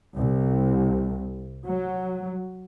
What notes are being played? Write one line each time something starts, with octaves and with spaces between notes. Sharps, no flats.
C2
F#3